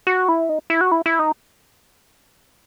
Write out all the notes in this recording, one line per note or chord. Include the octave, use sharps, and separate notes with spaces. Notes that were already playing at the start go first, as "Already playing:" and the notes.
F#4
E4
D#4
E4
F#4
E4
E4
D#4